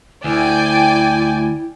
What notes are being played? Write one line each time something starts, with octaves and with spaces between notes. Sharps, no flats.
D2 E4 D5 G5 G#5